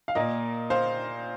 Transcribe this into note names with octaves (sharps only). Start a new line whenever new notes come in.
F5
A#2 A#3 A#4 D#5
C5 F5